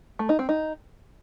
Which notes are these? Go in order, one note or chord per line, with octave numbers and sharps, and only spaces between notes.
A3
D#4
C4
D#4